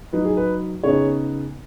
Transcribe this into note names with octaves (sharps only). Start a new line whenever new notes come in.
F#3 D#4 B4
G#4
B4
C#3 B3 D#4 G#4 C#5